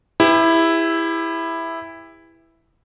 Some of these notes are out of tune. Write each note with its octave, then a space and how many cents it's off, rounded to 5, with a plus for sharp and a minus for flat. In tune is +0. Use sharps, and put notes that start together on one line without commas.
E4 +0 G4 +40 B4 +0